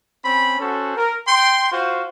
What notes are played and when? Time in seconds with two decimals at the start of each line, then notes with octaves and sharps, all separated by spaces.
0.25 C4 C#4 B5
0.60 C#4 F#4 A4 C5
0.97 A#4
1.28 G5 C6
1.72 F4 F#4 C5